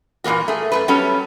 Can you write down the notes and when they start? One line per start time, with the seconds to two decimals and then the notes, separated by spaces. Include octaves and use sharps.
0.24 G2 A#2 E3 A#3 F#4
0.48 A3 G#4
0.72 F#2 A3 B4
0.88 F#3 G3 B3 C#4 A4